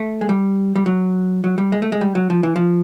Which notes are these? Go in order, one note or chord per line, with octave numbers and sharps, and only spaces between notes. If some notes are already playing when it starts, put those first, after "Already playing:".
Already playing: A3
G#3
G3
G3
F#3
F#3
G3
G#3
A3
G#3
G3
F#3
F3
E3
F3